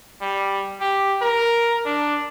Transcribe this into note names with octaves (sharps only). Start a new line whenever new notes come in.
G3
G4
A#4
D4